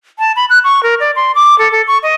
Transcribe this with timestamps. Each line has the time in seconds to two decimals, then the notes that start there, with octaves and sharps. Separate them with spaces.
0.19 A5
0.36 B5
0.50 F#6
0.64 C#6
0.83 A#4
1.00 D5
1.16 C6
1.35 D6
1.59 A4
1.72 A4
1.88 C#6
2.03 D#5